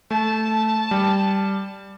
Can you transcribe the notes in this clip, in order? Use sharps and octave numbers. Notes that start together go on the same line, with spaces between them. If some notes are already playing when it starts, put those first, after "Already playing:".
A3 A5
G3